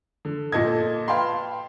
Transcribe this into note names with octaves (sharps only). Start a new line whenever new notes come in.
D3
A#2 A4 D#5 G#6
B4 F5 G5 A5 B5 C6